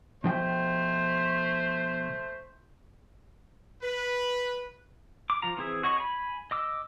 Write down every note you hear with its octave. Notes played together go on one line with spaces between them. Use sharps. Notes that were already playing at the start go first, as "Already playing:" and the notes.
B2 F3 A3 C5 G5
B4
D6
F3 F4 A#5
E3 C4 G#4 E5
F#4 C#5 D#5 C#6
G#5 B5
D#5 D6 E6